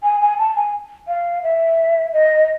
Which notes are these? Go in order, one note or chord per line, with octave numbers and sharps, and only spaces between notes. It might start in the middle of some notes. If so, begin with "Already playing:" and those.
G#5
G#5
A5
G#5
F5
E5
D#5